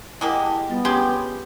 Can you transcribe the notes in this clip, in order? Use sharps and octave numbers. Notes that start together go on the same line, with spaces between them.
G#3 A#3 E4 G4 D#5 F#5
A5 D#6
G3 B3 F4 A6
C#3 G4 C6